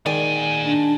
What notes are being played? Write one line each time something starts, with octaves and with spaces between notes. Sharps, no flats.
A#2 D#3 G#3 D5 G#5
D4